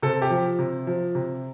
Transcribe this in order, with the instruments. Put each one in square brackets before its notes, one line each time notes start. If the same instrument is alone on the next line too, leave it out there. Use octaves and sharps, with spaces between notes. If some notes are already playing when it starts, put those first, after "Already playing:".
[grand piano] C3 A4
G4
F3
C3
F3
C3